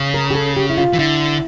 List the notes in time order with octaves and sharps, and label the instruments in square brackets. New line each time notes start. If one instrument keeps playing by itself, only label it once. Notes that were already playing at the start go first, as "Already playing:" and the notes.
Already playing: [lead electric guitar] C#3
[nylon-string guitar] A#4
G4
A4
G4
E4
F4
[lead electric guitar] E3
[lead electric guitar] D3 [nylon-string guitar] E4